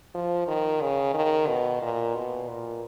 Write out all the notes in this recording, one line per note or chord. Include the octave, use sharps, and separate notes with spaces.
F3
D#3
C#3
D#3
B2
A#2
B2
A#2